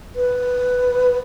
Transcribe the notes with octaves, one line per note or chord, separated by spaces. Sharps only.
B4